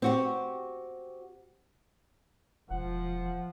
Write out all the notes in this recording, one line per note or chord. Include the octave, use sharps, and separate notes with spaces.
C4 F#4 G4
E1 F3 F#5